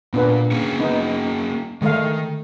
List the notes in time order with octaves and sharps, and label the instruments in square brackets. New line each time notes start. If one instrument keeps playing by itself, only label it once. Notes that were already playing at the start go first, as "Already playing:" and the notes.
[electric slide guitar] A#2 [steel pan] B3 D4 B4
[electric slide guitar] A#3 C#4 G#4
[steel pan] B3 D#4
[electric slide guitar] D#3 [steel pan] G#3 A3 F5